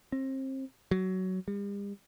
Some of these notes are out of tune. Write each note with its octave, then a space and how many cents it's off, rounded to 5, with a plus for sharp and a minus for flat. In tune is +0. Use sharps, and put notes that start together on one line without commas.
C4 +30
F#3 +15
G3 +45